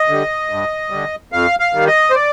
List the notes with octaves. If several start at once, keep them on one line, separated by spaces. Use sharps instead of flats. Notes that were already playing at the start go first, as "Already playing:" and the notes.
Already playing: D#5
D3 G3
G2
D3 G3
F2 F5
F5
D#3 G3
D#5
C5
D5